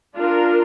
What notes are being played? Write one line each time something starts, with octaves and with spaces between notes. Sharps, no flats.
D4 F4 A#4